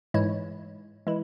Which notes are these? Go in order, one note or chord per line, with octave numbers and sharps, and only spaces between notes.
G#2 E3 G#3 E4 C#5
E3 G#3 E4